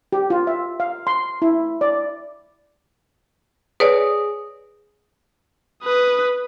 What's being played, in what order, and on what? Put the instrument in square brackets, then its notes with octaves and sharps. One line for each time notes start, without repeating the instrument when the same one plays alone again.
[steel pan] G4
F4
E5
F5
C6
E4
D5
[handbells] G#4 [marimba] B4 C#5 D5
[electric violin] B4 D#6